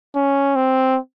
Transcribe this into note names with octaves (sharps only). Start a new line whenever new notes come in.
C#4
C4